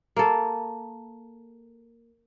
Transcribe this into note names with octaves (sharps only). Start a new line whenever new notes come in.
A#3 A4